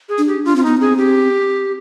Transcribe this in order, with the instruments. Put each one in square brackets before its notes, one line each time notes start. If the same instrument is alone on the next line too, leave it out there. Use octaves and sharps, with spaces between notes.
[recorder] G#4
[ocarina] D4
[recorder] G4
[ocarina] D4 [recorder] F4
[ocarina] C4 [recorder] F4
[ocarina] B3 [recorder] D#4
[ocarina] C4 [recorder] G#4
[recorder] G4